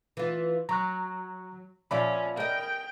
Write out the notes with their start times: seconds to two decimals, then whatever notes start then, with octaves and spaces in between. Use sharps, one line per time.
0.17 E3 F4
0.69 F#3 A#5 C#6 F#6
1.91 A#2 F3 C#4 F4 D5 E5 B5
2.37 A#4 D#5 G5